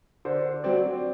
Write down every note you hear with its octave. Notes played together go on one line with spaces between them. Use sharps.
D3 C5
F#3 C4 D5